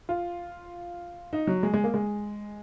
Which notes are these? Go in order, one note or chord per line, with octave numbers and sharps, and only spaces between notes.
F4
D#4
F#3
G#3
G#3
A#3
G#3